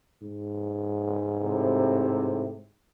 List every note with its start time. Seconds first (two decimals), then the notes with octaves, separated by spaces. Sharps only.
0.22 G#2
1.44 A2 C3